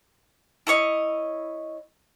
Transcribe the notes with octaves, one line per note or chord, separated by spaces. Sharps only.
E4 A4 C#5 D#5